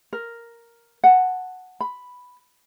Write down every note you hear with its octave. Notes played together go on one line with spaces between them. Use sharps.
A#4
F#5 A5
B5